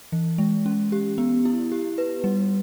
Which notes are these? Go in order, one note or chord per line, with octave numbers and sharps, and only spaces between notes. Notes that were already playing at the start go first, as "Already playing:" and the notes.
E3
G#3
C#4
G4
B3
E4
G4
B4
G3